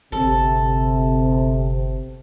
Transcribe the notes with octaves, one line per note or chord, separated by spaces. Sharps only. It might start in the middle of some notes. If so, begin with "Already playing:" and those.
G1 C3 A4